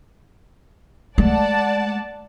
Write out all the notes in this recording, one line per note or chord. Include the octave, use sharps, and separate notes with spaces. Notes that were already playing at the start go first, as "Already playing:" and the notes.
G#3 A3 D5 F#5 A5